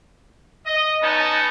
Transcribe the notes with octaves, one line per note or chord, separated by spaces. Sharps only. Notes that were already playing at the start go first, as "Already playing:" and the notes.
D#5
B3 C#4 D#4 A5